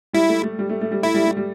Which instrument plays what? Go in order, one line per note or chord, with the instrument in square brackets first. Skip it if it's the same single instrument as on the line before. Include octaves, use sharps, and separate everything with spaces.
[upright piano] G3 [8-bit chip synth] E4
[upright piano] A3
A3
G3
A3
A3
G3
[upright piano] A3 [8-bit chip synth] E4
[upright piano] G3
A3
G3